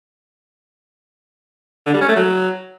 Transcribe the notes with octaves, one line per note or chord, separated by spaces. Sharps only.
D3
G3
C#4
A3
F#3